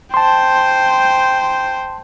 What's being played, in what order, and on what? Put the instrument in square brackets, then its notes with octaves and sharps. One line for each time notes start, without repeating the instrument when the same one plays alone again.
[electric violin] C5 G5 [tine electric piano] A5 C6